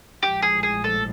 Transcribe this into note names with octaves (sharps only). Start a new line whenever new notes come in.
A#1 A2 F3 G#3 G4
G#4
G#4
A4